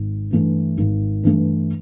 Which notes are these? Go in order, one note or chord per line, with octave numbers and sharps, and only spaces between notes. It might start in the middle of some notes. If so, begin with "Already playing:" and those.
Already playing: G#1
G2 E3 A3
G#1
G2 E3 A3